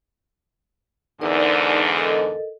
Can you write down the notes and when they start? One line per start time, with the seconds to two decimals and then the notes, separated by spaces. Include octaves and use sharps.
1.21 E2 G#2 D3 D#4 A#4 D5
1.97 A4 A#4 D#5